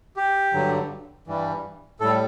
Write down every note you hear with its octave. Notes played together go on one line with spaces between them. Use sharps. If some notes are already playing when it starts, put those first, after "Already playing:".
G4
G2 D3 F#3
G2 E3 G3
A2 G3 A4